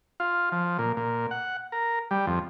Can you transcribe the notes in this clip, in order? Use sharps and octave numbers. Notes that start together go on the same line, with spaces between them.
F4
F3
A#2
A#2
F#5
A#4
G3
F2